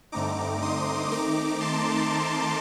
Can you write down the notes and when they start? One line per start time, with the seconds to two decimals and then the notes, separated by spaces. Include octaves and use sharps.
0.12 G2 D3 A3 C4 D#4 A#5 D6
0.62 C6 D#6
1.11 D#3 A3 C4 D#4 A#5 D6
1.60 A5 C6